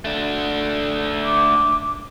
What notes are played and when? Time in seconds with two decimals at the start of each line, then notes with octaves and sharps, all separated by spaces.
0.05 A3 D4
1.24 D6